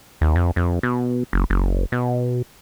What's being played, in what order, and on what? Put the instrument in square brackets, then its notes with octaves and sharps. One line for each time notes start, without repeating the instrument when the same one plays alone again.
[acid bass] D#2
F2
F2
B2
F#1
F#1
B2